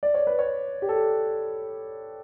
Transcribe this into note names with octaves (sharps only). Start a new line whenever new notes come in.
D5
C#5
B4
C#5
G4
A4